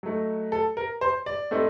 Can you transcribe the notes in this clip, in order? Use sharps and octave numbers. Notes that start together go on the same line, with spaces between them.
F#3 A3 D#4
A4
A#4
C5
D5
A2 A3 C4 D#4